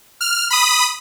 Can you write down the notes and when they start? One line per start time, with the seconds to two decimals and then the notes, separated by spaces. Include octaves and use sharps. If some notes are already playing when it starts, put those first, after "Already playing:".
0.21 F6
0.50 B5 D#6